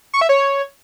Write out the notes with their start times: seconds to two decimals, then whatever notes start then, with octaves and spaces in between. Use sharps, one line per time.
0.14 C#6
0.21 E5
0.29 C#5